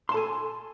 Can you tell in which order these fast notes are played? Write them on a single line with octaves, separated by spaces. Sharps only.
C6 A5 A4 G#5